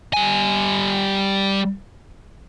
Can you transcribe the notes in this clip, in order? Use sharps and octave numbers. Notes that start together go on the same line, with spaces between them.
G3 G#5